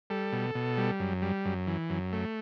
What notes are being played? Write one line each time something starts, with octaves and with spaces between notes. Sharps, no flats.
G3 A4
B2
B2
G3
F#2
G3
F#2
E3
F#2
A3